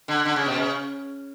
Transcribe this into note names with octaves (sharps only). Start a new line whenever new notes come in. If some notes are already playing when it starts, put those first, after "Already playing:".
D3
D3
C#3
B2
C#3